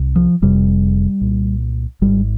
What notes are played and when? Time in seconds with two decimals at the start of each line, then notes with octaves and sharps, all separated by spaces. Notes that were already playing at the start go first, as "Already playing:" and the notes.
Already playing: C2 C3
0.16 F3
0.42 F1 F2 C3 G3
1.21 C2 A#2
2.01 G#1 G#2 G3